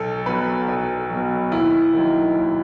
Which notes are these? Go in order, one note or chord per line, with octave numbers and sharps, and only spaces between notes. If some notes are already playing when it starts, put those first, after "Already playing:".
Already playing: B1 A4
B2 F#3 B4
B1
B2 F#3
D#2 E4
D#3 F#3
D#2